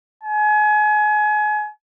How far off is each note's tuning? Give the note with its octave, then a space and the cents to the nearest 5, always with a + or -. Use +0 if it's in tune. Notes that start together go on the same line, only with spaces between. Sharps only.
G#5 +30